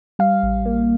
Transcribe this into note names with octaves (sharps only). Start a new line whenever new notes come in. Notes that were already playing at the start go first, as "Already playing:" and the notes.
G3 F5
A1
A#3